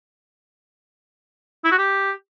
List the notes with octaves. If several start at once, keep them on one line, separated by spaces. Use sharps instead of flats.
E4
F#4
G4